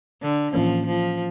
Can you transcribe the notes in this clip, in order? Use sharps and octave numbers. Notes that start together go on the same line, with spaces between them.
D3
A2 E3 F3 A#3 C#4
F3